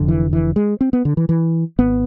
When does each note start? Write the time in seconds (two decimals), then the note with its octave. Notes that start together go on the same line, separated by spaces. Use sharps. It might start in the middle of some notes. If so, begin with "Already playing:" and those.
Already playing: F1 F2 D3
0.08 E3
0.33 E3
0.56 G#3
0.81 C4
0.93 B3
1.05 D3
1.17 E3
1.29 E3
1.78 G#1 B3